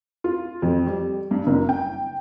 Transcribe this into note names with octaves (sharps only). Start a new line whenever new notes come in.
F4
F2
G3
G2
F#1
G5